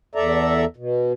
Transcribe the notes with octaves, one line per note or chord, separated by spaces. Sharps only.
E2 A4 D5 E5 A#5
B2